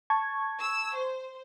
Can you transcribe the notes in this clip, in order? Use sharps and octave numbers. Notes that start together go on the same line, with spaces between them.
A5 C#6 G#6
E6
C5